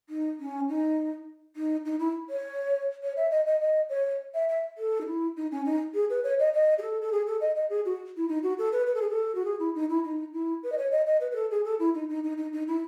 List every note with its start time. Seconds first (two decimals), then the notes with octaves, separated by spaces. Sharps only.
0.09 D#4
0.40 C#4
0.69 D#4
1.56 D#4
1.85 D#4
1.99 E4
2.30 C#5
3.03 C#5
3.17 E5
3.31 D#5
3.46 D#5
3.60 D#5
3.90 C#5
4.34 E5
4.49 E5
4.78 A4
5.01 D#4
5.07 E4
5.37 D#4
5.51 C#4
5.65 D#4
5.94 G#4
6.10 B4
6.24 C#5
6.39 D#5
6.54 D#5
6.78 G#4
6.82 A4
7.02 A4
7.12 G#4
7.27 A4
7.41 D#5
7.55 D#5
7.70 G#4
7.85 F#4
8.17 E4
8.28 D#4
8.43 F#4
8.58 A4
8.72 B4
8.87 B4
8.94 A4
9.01 G#4
9.10 A4
9.35 F#4
9.45 G#4
9.60 E4
9.75 D#4
9.89 E4
10.04 D#4
10.34 E4
10.63 B4
10.72 D#5
10.78 C#5
10.91 D#5
11.07 D#5
11.21 B4
11.31 B4
11.36 A4
11.51 G#4
11.64 A4
11.79 E4
11.94 D#4
12.09 D#4
12.24 D#4
12.37 D#4
12.53 D#4
12.68 E4